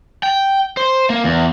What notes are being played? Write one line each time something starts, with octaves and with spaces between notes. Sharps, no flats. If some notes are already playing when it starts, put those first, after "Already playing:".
G5
C5
A#3
E2